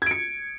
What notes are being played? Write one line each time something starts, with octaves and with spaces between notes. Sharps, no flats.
G#6 C#7 D7